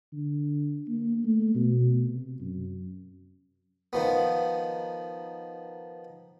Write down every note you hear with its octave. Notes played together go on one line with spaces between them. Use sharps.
D3
A#3
A3
B2
C3
F#2
D#3 F3 B3